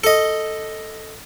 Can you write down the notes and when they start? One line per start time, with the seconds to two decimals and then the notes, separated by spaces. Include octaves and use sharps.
0.04 A4 D#5